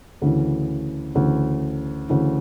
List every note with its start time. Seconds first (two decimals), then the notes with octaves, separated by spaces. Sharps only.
0.22 D2 C#3 E3
1.15 D2 C#3 E3
2.09 D2 C#3 E3